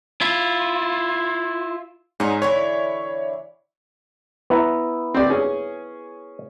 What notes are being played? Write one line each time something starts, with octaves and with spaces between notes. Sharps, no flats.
E4 F4
G#2 C#4 D#4
D3 E3 E4 C#5
B3 E4 A#5
C4 G4 D5
C#4 G#4